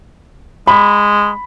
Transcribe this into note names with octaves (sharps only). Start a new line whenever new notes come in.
G#3 B5